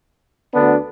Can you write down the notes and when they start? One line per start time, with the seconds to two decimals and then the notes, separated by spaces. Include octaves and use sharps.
0.54 D2 D3 B3 D4